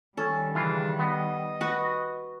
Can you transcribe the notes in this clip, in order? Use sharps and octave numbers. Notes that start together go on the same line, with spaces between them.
D#3 G3 C#4 A4
C#3 E3 D4 F4
B3 D#5
F#4 B4 F#5